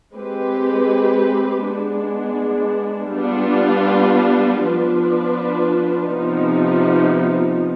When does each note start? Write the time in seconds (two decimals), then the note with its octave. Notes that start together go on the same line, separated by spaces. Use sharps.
0.15 G#3 C4 G4 B4
1.65 G#3 B3 D4
3.15 G3 B3 D4 F4
4.64 F3 B3 D4 F4 B4
6.14 C3 F3 B3 D#4